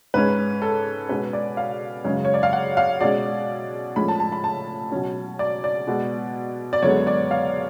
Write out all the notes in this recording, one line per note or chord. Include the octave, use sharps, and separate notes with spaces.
G#2 G#3 C#4 B4
A4
B2 G#3 C#4 B4
D5
F5
F#2 C#3 G#3 C#4
C#5
D5
F5
F#5
F5
B2 G#3 C#4 D5
A2 F3 G#3 C#4 B5
A5
A5
B5
A5
B2 F#3 C#4
D5
D5
B2 G#3 B3
D5
F#2 D3 G#3 B3 C#5
D5
F5